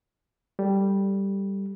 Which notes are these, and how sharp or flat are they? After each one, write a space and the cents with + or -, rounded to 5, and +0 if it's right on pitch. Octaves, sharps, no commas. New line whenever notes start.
G3 +0 A4 +0